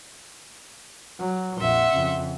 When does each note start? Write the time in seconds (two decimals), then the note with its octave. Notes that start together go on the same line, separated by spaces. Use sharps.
1.20 F#3
1.58 A#1 F2 E5 F#5 C6
1.92 F2 C#3